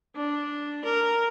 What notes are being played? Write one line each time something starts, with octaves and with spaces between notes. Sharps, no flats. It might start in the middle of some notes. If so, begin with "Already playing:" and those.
D4
A#4